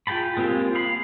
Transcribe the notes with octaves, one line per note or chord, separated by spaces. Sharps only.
F4 G#4 G5 A5 B5
G#3 A#3 C4 F4 G4
G#4 F5 B5